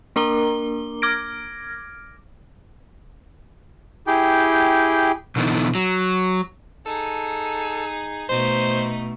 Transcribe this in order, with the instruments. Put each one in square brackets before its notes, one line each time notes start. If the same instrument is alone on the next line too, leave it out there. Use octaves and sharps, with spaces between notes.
[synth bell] A#3 D4 A#4 A#5 D6 G7
D6 F6 G#6 A#6 D7
[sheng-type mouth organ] E4 G4 G#4 G5
[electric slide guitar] B2 D3 E3 B3 D#4
F#3
[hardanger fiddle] D#4 G#4 [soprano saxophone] A4
[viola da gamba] B2 A3 [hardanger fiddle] D#4 D#5 [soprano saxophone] C5